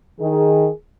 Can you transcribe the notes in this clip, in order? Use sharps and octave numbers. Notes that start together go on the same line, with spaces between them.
D#3 G#4